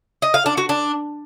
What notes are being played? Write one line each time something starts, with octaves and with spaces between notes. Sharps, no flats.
D#5
F5
D4
F#4
D4